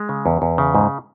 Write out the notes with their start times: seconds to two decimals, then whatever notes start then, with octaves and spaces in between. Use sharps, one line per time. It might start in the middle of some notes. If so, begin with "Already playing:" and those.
Already playing: G#3
0.09 C#3
0.26 E2
0.42 E2
0.58 C#3
0.75 G#2